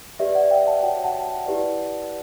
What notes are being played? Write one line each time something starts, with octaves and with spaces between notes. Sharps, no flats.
G4 B4 D5 E5
D5 F#5
E5 G5
F#5 A5
F#4 C#5 E5 G5
F#5 A5
F#5 A5
E4 G4 B4 D5